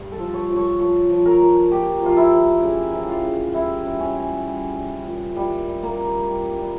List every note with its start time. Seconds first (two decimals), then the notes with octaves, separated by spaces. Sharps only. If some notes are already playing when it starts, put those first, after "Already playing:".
Already playing: G2
0.12 A4
0.19 F3
0.34 C#5
0.49 F3
0.57 C#5
0.79 F3 C#5
1.10 F3
1.26 A#4
1.41 A#2
1.71 A#2 G4
2.02 F3 F4
2.16 E4
2.32 F3
2.62 C#3
2.93 E3
3.09 F4
3.23 C#3
3.54 G3 E4
3.85 C#3
4.00 C#4
4.16 E3
4.46 G3
4.76 G3
5.07 A#2
5.36 A#2 G3
5.67 G3
5.83 A#3
5.97 G3
6.28 G3
6.59 G3